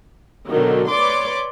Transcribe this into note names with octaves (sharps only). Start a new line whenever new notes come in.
B2 D3 D#3 F#3
B4 C#5 D5 C6 D6